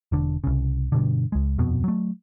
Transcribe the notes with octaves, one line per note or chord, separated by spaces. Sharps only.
E1 D3
C2 C#3
G2 B2 D3
C#2 G#3
D#1 F2 B2 B3
F#3 A3